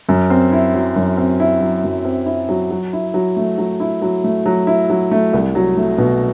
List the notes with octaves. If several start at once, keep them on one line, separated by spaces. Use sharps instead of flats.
F#2
C4
E4
F#3
F#2
C4
E4
F#3
F#2
C4
E4
F#3
F#3
E4
F#3
A3
F#3
E4
F#3
A3
F#3
E4
F#3
A3
C2
F#3
A3
B2